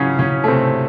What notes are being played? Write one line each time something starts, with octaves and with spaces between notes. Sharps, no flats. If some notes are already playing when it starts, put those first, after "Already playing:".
Already playing: C#3 E3 F#3 C#4 E4 F#4
C#3 C#4
A3
C3 C4